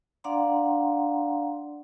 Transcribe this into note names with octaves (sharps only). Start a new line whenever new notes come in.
D4 D5 F5 F#5 A#5 C6